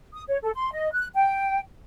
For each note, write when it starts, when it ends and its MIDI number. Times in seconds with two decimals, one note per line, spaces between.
0.14 0.23 87
0.28 0.37 73
0.42 0.50 69
0.55 0.70 84
0.72 0.91 75
0.92 1.07 90
1.15 1.60 79